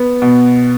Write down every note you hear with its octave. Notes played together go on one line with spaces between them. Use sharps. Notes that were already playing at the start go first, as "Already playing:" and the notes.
Already playing: B3
B2